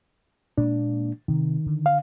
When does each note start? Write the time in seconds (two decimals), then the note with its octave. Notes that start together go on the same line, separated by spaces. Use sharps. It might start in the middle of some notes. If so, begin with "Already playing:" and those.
0.58 A#2 G#3 A#3 D4
1.28 C3 D#3
1.66 D3
1.86 F5